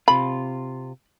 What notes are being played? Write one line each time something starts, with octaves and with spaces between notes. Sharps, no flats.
C3 F4 B5